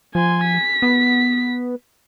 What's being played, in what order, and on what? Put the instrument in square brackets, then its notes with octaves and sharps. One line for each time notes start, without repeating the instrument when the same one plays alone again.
[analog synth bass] F3 [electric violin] G#5 C6
[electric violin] B6
[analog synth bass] B3